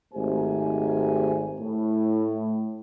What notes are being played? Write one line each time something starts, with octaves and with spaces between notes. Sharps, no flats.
G#1 G#2 A3 G4 C5 G#5
A2